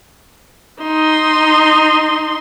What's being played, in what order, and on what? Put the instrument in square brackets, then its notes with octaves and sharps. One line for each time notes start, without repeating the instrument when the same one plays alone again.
[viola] D#4 C6